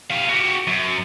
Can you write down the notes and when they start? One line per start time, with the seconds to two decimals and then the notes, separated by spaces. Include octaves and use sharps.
0.11 G4 F5
0.30 F#4 G4
0.67 F#2